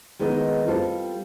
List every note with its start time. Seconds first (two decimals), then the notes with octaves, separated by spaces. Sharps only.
0.19 D#3 G#3 B3 D#4
0.66 G3 C4 F4 A4